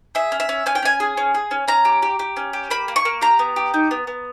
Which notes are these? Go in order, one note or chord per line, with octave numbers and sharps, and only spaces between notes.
G#4 E5
C#4
E5
C#4
C#4 G#5
G5
C#4 G#5
G#4
C#4
G#4
C#4
C#4 A#5
G4
G4
G4
C#4
G4
A#3 B5
A#3
C#6
A#3
G4 A#5
B3
G4
D#4
B3
B3